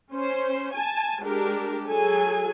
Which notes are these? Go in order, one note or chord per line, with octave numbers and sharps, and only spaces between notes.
C#4 C5
G#5 A5
G#3 D4 G4 A#4
F#3 G#4 A4 G#5